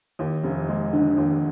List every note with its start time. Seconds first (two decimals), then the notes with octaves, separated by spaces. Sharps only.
0.19 D#2
0.43 F1
0.69 G#3
0.93 D3
1.18 D#2